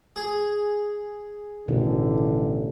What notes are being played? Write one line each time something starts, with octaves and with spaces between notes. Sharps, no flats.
G#4
A1 B2 D3 D#3